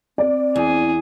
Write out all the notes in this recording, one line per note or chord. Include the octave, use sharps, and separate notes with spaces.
C4 D5
E2 G#4